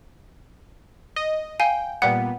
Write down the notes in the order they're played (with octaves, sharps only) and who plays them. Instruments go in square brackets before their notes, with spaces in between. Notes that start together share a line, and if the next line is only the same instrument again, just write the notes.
[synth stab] D#5
[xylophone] F5 G#5 [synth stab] G5
[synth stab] A#2 G3 B3 [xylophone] F#5